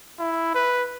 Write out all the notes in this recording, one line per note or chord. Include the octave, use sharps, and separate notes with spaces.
E4
B4